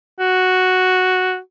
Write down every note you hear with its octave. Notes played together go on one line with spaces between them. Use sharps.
F#4